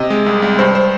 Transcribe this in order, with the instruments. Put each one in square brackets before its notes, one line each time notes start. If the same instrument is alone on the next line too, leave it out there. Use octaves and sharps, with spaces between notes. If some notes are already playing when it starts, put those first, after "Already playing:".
Already playing: [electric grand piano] C3 D#5
G#3
C2
C2
G2 C5
C5